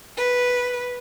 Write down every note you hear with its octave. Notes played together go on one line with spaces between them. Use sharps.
B4